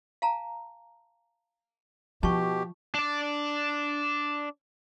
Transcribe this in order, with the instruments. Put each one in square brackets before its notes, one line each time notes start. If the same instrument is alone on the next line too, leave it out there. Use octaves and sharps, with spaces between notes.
[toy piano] F5 A5 A#5
[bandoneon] B2 G4 [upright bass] F3 [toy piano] A5 C#6
[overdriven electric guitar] D4 D5